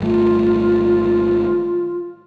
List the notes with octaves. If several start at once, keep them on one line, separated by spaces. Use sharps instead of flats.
G#1 G3 A3 F4